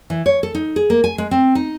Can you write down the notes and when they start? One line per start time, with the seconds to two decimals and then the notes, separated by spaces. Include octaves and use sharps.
0.10 E3
0.26 C#5
0.43 A4
0.55 D#4
0.76 G#4
0.90 A#3
1.04 G#5
1.18 G#3
1.31 C4
1.55 D#4